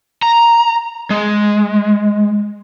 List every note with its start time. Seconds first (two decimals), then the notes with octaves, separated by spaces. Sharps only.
0.22 A#5
1.10 G#3